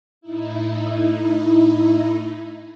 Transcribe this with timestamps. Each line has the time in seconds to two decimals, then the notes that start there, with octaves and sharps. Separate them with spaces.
0.21 A2 D#4 E4